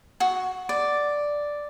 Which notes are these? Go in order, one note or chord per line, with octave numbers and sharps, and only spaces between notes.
F#4
D5